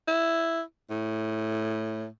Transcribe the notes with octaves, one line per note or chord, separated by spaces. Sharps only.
E4
A2